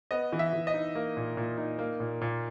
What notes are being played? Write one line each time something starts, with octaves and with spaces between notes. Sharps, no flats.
B3 D#5
E3
E5
E3
D#5
D#4
A#3
A#2
A#2
D#4
A#3
A#2
A#2